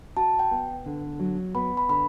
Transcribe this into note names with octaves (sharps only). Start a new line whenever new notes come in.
F#4 A5
G5
B3
D3
F#3
B3 B5
B5
D3 B5